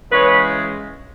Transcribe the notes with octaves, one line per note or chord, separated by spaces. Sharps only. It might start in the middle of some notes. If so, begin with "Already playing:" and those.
C#3 E3 G#3 B4 C#5